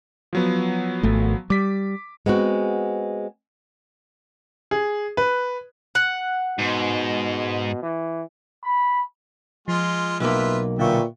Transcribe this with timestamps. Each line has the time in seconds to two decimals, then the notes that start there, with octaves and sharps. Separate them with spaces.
0.33 F3 F#3 B3
1.03 G#1 A3
1.50 G3 D6 B6
2.26 G#3 B3 C4 F#4
4.71 G#4
5.17 B4
5.95 F#5
6.58 G#2 B2
7.82 E3
8.63 B5
9.68 F3 G#3 F4
10.20 B1 A#3 F4 B4 E5
10.79 A#2 D3 B3 E5 F5 G5 C#6